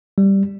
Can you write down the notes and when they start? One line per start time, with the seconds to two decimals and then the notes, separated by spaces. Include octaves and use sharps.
0.18 G3